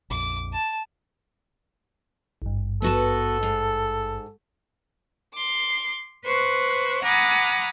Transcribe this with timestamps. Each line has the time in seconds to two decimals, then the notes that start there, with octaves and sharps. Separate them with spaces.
0.10 A#1 F2 D6
0.52 A5
2.42 G#1 G2
2.82 B3 F#4 A4 A5
3.43 G#2
5.34 C6 D6
6.26 B4 C5 C#6 F#6
7.04 F#5 G#5 A#5 B5 D6 D#6